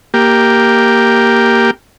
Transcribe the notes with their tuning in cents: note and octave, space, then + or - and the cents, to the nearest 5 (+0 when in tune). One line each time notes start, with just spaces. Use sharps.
A#3 +0 G4 +0